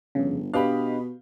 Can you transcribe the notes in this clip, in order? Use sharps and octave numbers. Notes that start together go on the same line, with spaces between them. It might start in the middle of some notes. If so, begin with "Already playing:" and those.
G1 F2 C#3
B2 D4 G4 B4 D#5 F5 B5